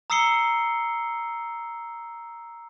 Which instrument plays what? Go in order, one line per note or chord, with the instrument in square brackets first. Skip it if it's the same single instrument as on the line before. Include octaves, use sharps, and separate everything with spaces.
[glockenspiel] A#5 D#6 E6 C7 C#7 G7